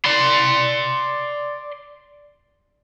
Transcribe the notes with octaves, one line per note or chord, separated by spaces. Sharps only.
D5 C6